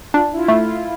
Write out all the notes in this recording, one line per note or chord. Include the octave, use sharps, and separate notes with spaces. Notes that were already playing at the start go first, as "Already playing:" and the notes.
D4 F4
E4
F4
A3
F4